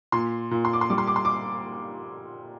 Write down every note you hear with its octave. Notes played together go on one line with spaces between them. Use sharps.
A#2 C6
A#2
C6
D6
C6
G3 D6
C6
D6
C6
D6